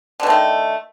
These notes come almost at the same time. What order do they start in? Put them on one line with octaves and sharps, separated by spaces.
D3 B2 A3 D#3